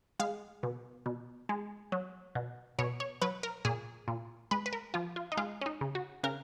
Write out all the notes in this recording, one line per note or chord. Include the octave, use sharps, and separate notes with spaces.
G#3 F5
B2
B2
G#3
F#3
B2
B2 C#5
C#5
F#3 B4
A#4
A#2 G#4
A#2
G#3 B4
B4
A#4
F3 F4
F4
D#4
G#3 F4
C#4
D#4
C#3
F#4
C#3 A#4